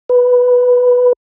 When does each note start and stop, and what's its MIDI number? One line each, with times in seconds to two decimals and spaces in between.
0.09 1.13 71